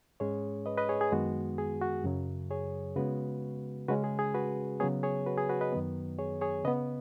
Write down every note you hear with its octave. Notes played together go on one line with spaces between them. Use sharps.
G#2 G#3 C#4 G#4 C#5
B4 D#5
B4 D#5
G#4 C#5
G#4
F#2 D#3 G#3 B3 F#4
G#4
F#4
F#2 C#3 F#3
G#4 C#5
C#3 G#3 B3 F#4 B4
C#3 G#3 C#4 F#4 B4
G#4
G#4
F#4 B4
C#3 F#3 B3 G#4 C#5
G#4 C#5
F#4 B4
G#4
F#4 B4
B4 D#5
F#2 D#3 F#3 B3
G#4 C#5
G#4 C#5
C#3 B3 B4 D#5